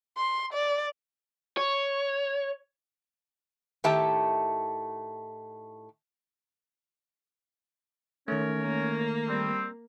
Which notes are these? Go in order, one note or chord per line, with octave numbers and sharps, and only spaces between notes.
C6
D5
C#5
A2 D#3 A3 G4 E5 A5
D#3 A3 C#4 A#4 C#5
A#3
G3 C4